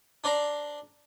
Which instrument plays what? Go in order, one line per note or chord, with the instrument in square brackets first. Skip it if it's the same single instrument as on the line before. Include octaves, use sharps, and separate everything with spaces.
[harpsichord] D4 C5 D5 A#5